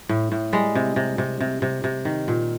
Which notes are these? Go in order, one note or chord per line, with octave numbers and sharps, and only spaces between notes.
A2
A2
G3 G#3
C3
C3
C3
C3
C3
C3
D#3
A#2